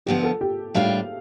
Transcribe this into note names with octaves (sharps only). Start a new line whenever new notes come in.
F2 D3 F3 B3 G4
A4
G4
A2 G3 D4 F4 F5